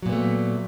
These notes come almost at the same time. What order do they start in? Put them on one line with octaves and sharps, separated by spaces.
F#3 A#2 B3 A3